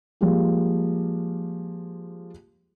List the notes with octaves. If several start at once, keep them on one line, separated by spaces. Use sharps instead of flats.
F3 G3 G#3 A#3 G4